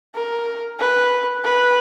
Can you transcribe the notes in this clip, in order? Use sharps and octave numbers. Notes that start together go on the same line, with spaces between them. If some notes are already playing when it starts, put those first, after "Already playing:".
A#4
B4
B4